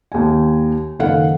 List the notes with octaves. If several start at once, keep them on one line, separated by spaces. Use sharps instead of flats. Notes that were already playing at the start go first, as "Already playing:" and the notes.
D#2 G#5
F#1 D#3 A4 F5 F#5